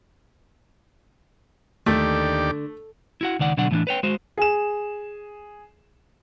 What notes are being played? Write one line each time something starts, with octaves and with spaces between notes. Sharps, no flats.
D#2 D3 A3 G4 D5
E4 F#4 F#5
C#2 D#3 D5 F#5
B2 D3 F#3 D4 F#5
A2 E3 C4 D4
B4 C#5 G5
G#3 F#4 C5
G#4 E7